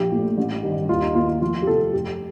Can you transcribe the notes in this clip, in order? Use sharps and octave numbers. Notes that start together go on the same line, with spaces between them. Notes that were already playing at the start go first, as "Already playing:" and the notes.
Already playing: A#1 G4
A#2 A3
A1
G2 D#3 G3
D#2 F4
D#4
D#3 A#3 F4
F4
F1 F4
G4
F2 C3 F3 A4
F1 G4